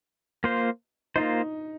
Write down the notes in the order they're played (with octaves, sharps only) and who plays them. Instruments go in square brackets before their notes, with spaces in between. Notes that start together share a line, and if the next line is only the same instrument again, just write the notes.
[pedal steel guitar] A#3 F4 C5
[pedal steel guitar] A#3 F4 C5 [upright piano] D#4